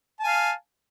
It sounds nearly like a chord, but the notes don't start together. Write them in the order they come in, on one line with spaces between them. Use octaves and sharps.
A5 G#5 F5